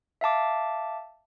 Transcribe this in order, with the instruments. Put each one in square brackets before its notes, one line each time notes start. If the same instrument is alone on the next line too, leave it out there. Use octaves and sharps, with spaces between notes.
[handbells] E5 F5 A5 D6